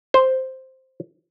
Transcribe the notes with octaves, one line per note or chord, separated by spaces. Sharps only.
C5